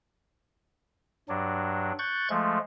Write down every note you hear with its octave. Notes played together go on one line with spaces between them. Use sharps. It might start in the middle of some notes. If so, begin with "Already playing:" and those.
G2 F#3 D4
C#6 F#6 G6 A6
F3 G#3 A3